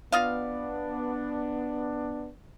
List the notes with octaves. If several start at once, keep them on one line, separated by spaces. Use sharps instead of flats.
B3 D4 F4 D#5 F5